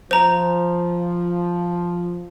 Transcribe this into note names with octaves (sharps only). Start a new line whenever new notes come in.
F3 C5 A#5